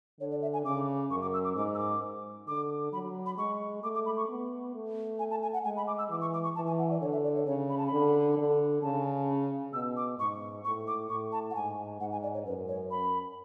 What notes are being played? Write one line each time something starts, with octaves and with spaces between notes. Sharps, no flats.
D3 C#5
D5
E5
G#5
C#3 D6
F#2 C#6
D6
E6
D6
G#2 D6
E6
D6
D3 D6
F#3 B5
B5
G#3 C#6
A3 D6
D6
B5
C#6
B3
A3
G#5
A5
G#5
F#5
G#3 G#5
B5
D6
E6
E3 D6
C#6
D6
C#6
E3 A5
G#5
F#5
D5
D3 C#5
E5
D5
C#5
C#3 C#5
B5
A5
D3 B5
D3
C#3 A5
B2 E6
D6
G#2 C#6
A2 C#6
D6
A2 C#6
A5
F#5
G#2 G#5
G#2 F#5
G#5
D5
C#5
F#2 B4
C#5
B5